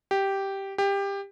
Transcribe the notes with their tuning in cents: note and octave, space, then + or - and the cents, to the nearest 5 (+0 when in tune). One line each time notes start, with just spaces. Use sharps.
G4 -5
G4 +20